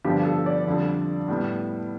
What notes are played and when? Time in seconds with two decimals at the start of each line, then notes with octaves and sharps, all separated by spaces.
0.04 G2 D3 F3 B3 G4
0.25 A4
0.46 D5
0.67 F2 D3 G3
1.28 A2 G3 B3